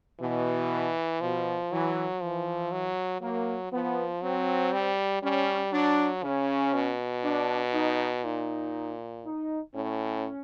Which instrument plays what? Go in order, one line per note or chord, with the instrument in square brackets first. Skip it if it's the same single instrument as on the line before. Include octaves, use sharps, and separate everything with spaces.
[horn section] B2 [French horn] E3
[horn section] B2 [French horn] F3
[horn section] E3 [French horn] F#3
[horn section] E3 [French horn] F3
[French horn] F#3
[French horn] F#3 [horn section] A#3
[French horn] F3 [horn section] B3
[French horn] F#3 [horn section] C4
[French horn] G3
[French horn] G3 [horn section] C#4
[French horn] F#3 [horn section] D4
[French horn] C#3 [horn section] C#4
[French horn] B2
[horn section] D4
D#4
[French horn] A#2 [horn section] D#4
[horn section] D#4
[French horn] A2 [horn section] C#4